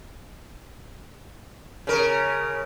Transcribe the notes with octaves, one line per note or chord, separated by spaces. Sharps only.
C#3 A#4